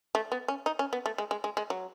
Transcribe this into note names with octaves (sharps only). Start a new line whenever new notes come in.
A3
B3
C#4
D#4
C#4
B3
A3
G#3
G#3
G#3
G#3
F#3